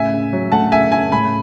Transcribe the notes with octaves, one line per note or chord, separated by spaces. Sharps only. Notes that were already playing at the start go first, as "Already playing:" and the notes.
Already playing: A2 C#3 E5 G#5
C#3
F#3
A3 F#5 A5
C#3 E5 G#5
C#3 E5 G#5
A2 G#5 B5